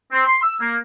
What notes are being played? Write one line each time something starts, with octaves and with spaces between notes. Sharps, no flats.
C4
C6
E6
A#3